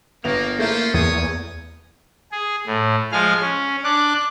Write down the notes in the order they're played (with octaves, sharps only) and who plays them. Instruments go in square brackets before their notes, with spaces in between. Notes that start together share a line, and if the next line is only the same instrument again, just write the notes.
[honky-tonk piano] G1 B3 F7 [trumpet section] A#3
[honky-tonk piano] A3 A#3 E4 [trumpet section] C#4 F4 C5
[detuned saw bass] E2 [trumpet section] C#5 G#5 D#6
[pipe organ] G#4
A2
F3 G#3 G#4 F5 F6
C#4
D4 D6 F#6